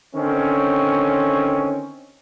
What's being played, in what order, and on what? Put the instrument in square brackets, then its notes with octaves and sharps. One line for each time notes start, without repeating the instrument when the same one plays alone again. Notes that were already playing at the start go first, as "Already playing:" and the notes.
[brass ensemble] D3 D#3 C4 C#4